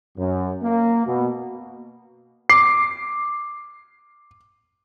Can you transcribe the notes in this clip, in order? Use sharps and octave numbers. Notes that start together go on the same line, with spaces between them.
F#2
A#3
B2
D6 C7